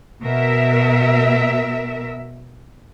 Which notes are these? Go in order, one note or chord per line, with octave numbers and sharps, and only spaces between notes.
B2 A#4 E5